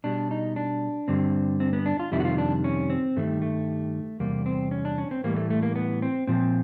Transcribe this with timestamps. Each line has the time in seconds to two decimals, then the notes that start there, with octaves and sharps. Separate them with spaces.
0.04 B2 G3 D4
0.31 D#4
0.56 D4
1.08 G2 D3 G3 C4
1.60 C4
1.73 B3
1.86 D4
2.00 F4
2.12 F2 C3 D#3 G3 E4
2.20 F#4
2.25 F4
2.38 D4
2.64 C#4
2.90 C4
3.16 G2 D#3 G3 A3
3.42 A3
4.20 E2 C3 G3 A#3
4.46 C4
4.71 C#4
4.85 D4
4.98 C#4
5.11 C4
5.24 A2 E3 G3 A#3
5.36 A3
5.50 A3
5.62 A#3
5.76 B3
6.02 C4
6.27 A#2 F3 C4